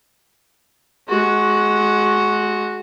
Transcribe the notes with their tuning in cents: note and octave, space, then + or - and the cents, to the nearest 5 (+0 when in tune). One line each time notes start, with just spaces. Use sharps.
G#3 +25 F#4 +0